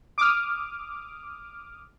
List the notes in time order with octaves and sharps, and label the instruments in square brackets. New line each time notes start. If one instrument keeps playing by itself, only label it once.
[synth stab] D6 D#6 F6